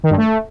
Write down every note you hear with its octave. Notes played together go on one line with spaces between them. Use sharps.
D#3
G2
A3